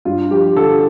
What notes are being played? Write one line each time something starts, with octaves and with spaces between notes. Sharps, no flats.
G2 F4
F3 G4
D3 A4